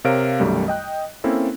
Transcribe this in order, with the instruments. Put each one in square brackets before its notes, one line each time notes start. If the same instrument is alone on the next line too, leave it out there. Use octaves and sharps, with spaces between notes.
[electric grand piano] C3 A#4 C#5 F5 D7
B1 F#2 D#3 G3 A3
D#5 G5 F#6
A#3 C4 C#4 E4 A4